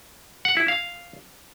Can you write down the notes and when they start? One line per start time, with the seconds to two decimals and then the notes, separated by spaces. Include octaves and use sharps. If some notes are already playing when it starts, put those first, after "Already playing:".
0.45 F#5
0.57 E4
0.68 F5